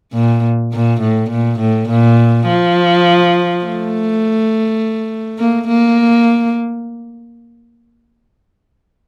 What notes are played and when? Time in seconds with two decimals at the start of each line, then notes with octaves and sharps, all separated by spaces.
0.14 A#2
0.73 A#2
1.01 A2
1.30 A#2
1.60 A2
1.89 A#2
2.47 F3
3.65 A3
5.38 A#3
5.68 A#3